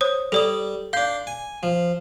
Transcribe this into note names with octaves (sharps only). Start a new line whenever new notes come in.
C5 C#5 D#6
G3 A4 D5 D#6
D4 F5 C6 G6
G#5
F3